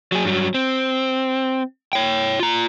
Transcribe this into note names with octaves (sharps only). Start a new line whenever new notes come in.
F#3 G#4
G2 F#3
C4
C#5 G5
F4 A#5